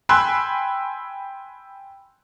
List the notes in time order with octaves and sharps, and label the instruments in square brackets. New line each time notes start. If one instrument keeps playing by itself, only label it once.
[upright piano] G5 G#5 B5 C6 E6 F#6